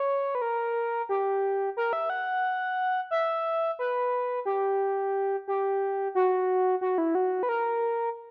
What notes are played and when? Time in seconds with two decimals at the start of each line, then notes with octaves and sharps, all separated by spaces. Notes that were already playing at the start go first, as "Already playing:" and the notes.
Already playing: C#5
0.35 B4
0.42 A#4
1.09 G4
1.77 A#4
1.93 E5
2.10 F#5
3.11 E5
3.79 B4
4.45 G4
5.48 G4
6.15 F#4
6.81 F#4
6.98 E4
7.15 F#4
7.43 B4
7.49 A#4